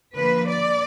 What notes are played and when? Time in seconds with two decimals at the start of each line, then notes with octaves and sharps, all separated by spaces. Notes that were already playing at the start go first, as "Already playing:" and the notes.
0.15 D3 F3 A#3 B4
0.47 D5